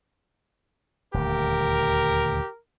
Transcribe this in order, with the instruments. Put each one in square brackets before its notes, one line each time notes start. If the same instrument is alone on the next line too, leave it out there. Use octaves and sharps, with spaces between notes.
[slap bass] D#1 D2 [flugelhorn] G4 [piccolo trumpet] A#4